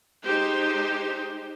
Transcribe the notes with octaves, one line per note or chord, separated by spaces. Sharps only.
G#3 D#4 G4 C5